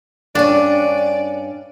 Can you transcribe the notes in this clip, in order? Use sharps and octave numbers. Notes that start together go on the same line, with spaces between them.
G2 C#4 D4 D5